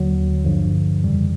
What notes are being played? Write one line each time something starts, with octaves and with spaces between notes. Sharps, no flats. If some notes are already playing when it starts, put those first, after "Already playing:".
Already playing: D#2 D3 F#3
A1 G2 D3 F3
F2 C#3 E3 G3